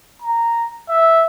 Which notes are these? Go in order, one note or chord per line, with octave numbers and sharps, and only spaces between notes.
A#5
E5